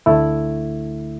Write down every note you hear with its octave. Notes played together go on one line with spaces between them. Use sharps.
D2 D3 A3 E4